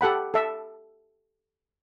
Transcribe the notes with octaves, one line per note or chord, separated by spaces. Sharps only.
G4 A4 F#5 B5
A4 E5